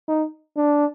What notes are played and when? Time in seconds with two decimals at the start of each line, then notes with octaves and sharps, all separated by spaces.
0.08 D#4
0.57 D4